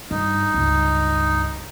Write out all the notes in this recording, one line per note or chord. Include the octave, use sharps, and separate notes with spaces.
G2 D#4
C#2 G2